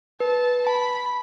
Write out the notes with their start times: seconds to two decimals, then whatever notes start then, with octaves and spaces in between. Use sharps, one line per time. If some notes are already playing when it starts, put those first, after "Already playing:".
0.20 B4 A5
0.66 A5 B5